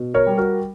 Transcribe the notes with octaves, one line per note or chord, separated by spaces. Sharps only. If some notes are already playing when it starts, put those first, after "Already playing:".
Already playing: B2
A#4 C#5
G3
F#4 A#4